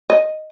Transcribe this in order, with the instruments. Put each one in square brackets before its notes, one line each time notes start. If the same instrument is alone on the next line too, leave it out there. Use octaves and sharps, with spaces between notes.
[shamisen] D#5